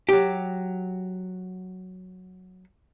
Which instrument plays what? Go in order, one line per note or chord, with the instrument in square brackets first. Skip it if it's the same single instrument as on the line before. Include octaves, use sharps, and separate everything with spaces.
[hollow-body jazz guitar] F#3 G4